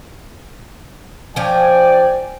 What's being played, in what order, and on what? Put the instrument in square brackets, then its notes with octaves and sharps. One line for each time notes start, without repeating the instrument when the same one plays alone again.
[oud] F3 C#4 [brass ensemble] D5 G5 G#5